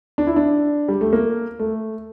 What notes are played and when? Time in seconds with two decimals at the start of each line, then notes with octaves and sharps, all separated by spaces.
0.18 D4
0.27 E4
0.36 D4
0.88 G3
1.01 A3
1.13 A#3
1.59 A3